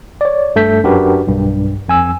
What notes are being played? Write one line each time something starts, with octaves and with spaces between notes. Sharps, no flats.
C#5 D5
G2 A3 A4 G6 B6
F#2 D4 F#4 G4 A#4 B4
B1 G2
F2 G#5 E6